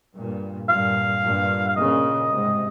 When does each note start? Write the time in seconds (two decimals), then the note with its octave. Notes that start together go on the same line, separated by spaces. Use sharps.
0.16 G2 A#2
0.69 G2 A#2 F5
1.23 G2 A#2
1.68 F5
1.76 A#2 C#3 D#5
2.30 G#2 C3